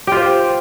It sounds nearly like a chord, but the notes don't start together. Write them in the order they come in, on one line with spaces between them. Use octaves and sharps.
G4 F4 C5